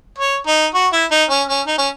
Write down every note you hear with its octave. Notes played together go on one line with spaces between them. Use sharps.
C#5
D#4
F#4
E4
D#4
C#4
C#4
D#4
C#4